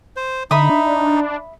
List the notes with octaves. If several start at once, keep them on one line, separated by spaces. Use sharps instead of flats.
C5
D3 D#4 E5 B5 D#6
D4